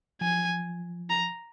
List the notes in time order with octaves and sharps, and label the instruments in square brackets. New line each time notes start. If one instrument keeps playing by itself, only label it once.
[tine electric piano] F3 [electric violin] G#5
[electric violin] A#5